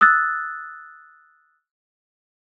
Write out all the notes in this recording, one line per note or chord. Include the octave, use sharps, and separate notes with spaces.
D#6 E6 F#6 A6